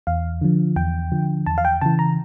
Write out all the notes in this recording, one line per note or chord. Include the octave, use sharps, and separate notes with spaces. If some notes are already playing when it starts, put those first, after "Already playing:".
E2 F5
D3 F3
E2 G5
D3 F3
E2 A5
F5
G5
C#3 E3 A5
A#5